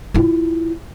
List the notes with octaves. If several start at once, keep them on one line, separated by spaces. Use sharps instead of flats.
E4 F4